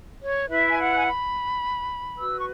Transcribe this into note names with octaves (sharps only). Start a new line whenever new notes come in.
C#5
E4 B4 E5
G#5
F#5
G#5
B5
F#4 B4 E6
C#6